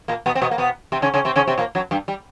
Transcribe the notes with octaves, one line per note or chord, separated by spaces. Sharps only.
A#2 A#3
B2 B3
C4
B2 B3
A#3
B2 B3
C3 C4
C#3 C#4
C#3 C#4
C3 C4
C#3 C#4
C3 C4
A#2 A#3
F#2 F#3
G2 G3
G3